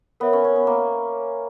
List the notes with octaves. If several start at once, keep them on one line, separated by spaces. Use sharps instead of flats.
B3 A#4 C#5 E5
C#4
C#4
B3
A#3